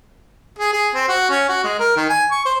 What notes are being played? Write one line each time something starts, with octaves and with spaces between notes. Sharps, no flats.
G#4
G#4
C4
F#4
C#4
F#4
G#3
A#4
D#3
G#5
C#6
C5